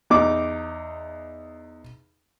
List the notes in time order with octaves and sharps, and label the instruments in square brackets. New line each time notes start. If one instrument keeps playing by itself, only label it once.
[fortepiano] E2 D#4 D6